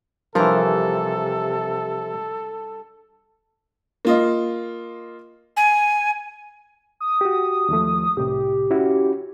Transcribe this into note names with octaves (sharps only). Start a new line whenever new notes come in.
C3 E3 F3 G3 D4 A4 A#4
A#3 F4 D#5
G#5
D#6
F#4 G4
D#2 F3 A3
C2 A2 C3 G4
C#4 E4 F#4